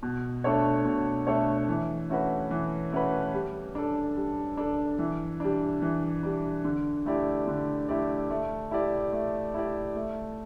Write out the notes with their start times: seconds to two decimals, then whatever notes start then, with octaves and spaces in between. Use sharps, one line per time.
0.02 B2
0.44 A3 D4 A4 C#5
0.85 B2
1.27 A3 D4 A4 C#5
1.68 E3
2.09 A3 C#4 F#4 B4
2.51 E3
2.92 A3 C#4 F#4 B4
3.34 G3
3.75 D4 A4
4.16 G3
4.57 D4 A4
4.99 E3
5.40 G3 D4
5.82 E3
6.23 G3 D4
6.64 D3
7.06 A3 E4 G4 D5
7.47 D3
7.89 A3 E4 G4 D5
8.30 A3
8.71 E4 G4 D5
9.12 A3
9.54 E4 G4 D5
9.95 A3